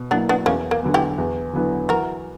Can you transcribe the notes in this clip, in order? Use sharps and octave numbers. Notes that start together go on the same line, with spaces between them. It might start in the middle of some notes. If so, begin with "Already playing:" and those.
Already playing: B2
F#3 A#3 B3 D4 E4
B3 D4
E2 A#3 C#4
A#3
D3 F#3 B3
E4 G4
E2
D3 F#3 B3 E4
E3 F#4 A#4